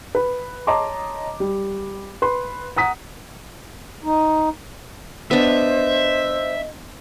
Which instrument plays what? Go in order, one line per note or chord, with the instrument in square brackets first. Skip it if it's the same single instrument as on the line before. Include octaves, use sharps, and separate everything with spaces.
[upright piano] B4
C#5 D#5 A5 A#5 C6 D6
G3
B4 C6
F#5 A#5 D#6 B6
[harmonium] D#4
[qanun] B3 D4 [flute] C5 [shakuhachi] D#5 [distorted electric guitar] E5